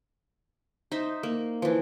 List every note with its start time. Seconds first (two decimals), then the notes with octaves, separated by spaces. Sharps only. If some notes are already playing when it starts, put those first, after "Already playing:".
0.92 D#4 C5 E5
1.23 A#3
1.62 E3 F3